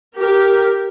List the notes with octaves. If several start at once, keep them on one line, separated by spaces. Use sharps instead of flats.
G4 A#4